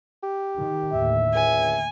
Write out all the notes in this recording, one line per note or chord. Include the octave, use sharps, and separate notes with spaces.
G4
D#3
D#2 A2 D3 E5
C#2 G#5